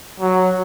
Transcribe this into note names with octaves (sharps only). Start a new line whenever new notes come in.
F#3